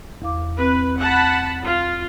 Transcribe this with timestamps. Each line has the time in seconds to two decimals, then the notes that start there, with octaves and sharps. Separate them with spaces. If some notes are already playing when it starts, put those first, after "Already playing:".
0.22 E2 F5 D6
0.59 C4 B4
0.99 F#5 A5 B5
1.64 F4